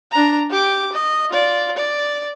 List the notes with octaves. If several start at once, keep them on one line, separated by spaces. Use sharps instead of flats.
D4 A#5
G4 D6
D#5
F4 D5
D5